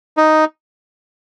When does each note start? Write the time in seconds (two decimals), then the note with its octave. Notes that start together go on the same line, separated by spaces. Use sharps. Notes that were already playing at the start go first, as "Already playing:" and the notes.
0.17 D#4